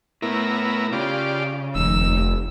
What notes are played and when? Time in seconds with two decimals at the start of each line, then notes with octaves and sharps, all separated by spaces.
0.22 A2 B3 E4 A#4
0.92 C#3 F4 G4 D5
1.75 F1 D#2 E6